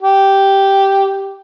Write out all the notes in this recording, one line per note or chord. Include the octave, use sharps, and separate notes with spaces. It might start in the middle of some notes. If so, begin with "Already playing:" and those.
G4